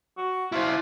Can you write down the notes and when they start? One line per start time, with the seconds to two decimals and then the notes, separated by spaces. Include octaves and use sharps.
0.17 F#4
0.52 E4 F4 C5